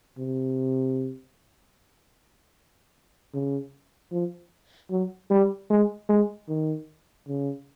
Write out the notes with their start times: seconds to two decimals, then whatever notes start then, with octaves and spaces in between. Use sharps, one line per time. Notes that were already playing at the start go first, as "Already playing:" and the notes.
0.18 C3
3.34 C#3
4.12 F3
4.91 F#3
5.30 G3
5.70 G#3
6.09 G#3
6.49 D#3
7.28 C#3